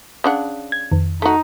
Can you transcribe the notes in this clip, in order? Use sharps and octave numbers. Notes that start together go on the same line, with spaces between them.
C#3 D4 F#5
G#6
F2 D#3
A3 D#4 F#4